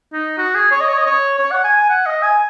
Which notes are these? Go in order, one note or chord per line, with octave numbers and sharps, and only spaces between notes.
D#4
F#4
G#4
C#5
D#5
C#5
D#5
C#5
C#5
F#5
G#5
G#5
F#5
D#5
G#5